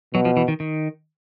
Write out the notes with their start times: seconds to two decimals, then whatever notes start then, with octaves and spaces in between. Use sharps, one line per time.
0.14 B2 F#3
0.25 F3
0.37 E3
0.48 D#3
0.60 D#3